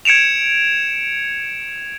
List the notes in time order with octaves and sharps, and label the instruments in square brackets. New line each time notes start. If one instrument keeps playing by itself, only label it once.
[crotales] G#6 C#7 D7 E7 F7